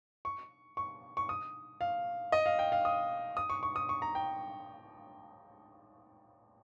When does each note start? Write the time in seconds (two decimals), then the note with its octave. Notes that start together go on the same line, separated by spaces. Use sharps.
0.25 C#6
0.77 C#6
1.17 C#6
1.29 D#6
1.81 F5
2.32 D#5
2.46 F5
2.59 G5
2.72 F5
2.85 D#6
3.37 D#6
3.50 C#6
3.63 C#6
3.76 D#6
3.89 C#6
4.02 A#5
4.15 G5